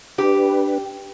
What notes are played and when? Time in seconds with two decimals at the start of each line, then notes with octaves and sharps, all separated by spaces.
0.18 D4 G4 B4